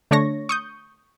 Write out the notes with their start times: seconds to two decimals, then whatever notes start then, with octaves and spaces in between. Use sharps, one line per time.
0.11 D3 A3 D4 C#5 C#6 A#6
0.49 C#6 D#6 G6